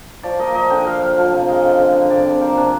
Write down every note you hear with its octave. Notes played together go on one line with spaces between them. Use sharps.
F3 D5
A#3 D#5
F3 D#5
D3 G5
F3 F5
F3 F5
F3
C3
G#3 D#5
D3
D3
D3
C3 D5
C3
A#3 C5
C3 D4